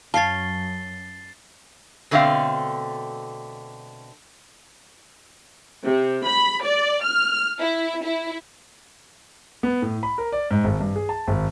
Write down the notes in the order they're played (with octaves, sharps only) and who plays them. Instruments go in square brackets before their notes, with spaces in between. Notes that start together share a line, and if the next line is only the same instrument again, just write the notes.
[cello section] F#2 [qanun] C#5 F5 [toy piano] A5 [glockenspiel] A6 C7 G7
[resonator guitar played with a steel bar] B2 D3 F3 A3 C4 F5
[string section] C3
B5
D5
F6
E4
E4
[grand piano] B3
A2
B5
A#4
D5
G#2
G#1
G2
G#4
A5
G#1